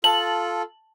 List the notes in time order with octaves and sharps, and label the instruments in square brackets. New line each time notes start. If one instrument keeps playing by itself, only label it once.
[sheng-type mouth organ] F4 A4 [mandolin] A5 [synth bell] F#7